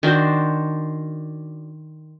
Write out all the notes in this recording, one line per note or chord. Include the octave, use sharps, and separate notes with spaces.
D#3 D4 F#4 C5